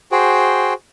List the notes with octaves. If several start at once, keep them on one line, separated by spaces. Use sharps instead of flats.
F#4 G#4 C5 G5